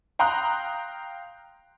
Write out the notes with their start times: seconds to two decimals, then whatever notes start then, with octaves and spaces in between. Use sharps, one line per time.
0.19 F5 G5 A#5 C6 D#6 F#6